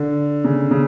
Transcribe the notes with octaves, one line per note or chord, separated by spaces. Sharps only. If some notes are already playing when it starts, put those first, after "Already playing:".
Already playing: D3
C#3
C#3